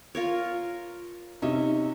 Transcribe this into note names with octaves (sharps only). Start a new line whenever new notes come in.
F4 A#4 C#5
C3 C#4 D#4 E5